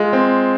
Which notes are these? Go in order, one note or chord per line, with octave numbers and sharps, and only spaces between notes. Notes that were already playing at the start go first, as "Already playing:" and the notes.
Already playing: G#3 F4
C4